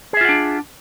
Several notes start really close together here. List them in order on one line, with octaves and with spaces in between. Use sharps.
G#4 E5 F4 F#5 D4